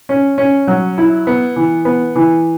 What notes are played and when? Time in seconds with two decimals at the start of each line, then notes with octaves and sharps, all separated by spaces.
0.09 C#4
0.38 C#4
0.68 F#3
0.98 E4
1.27 B3
1.56 E3
1.85 B3
2.16 E3